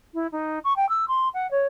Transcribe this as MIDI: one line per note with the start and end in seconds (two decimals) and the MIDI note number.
0.14 0.27 64
0.32 0.59 63
0.64 0.76 85
0.76 0.88 79
0.89 1.05 88
1.08 1.29 84
1.34 1.50 78
1.51 1.67 73